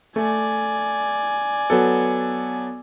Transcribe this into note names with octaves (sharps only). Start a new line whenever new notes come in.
A3 D5 G#5
F#3 B3 A4